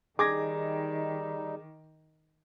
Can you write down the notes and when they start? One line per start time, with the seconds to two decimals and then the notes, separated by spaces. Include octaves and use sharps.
0.19 D#3 G3 D#4 G#4 D6 G#6 A#6